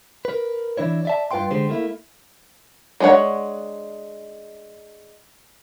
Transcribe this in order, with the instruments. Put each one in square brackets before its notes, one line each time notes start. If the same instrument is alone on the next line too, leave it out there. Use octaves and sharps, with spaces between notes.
[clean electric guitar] A#4 B4
E3 D4 E4 C#5
D5 E5 A5
G2 F4 B4 F#5 G5 C6
D3 G#3 G4 C5
A3 A#3 E4
[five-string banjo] G#3 D4 G#4 C#5 F#5